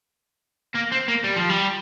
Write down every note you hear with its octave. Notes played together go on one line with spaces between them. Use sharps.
A#3
C4
A#3
G3
F3
G3